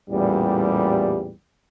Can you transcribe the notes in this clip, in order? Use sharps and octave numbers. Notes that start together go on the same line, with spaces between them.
A1 E2 A#2 G3